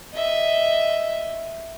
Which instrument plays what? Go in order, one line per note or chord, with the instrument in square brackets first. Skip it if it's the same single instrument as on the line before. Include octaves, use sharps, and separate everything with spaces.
[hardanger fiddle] D#5 E5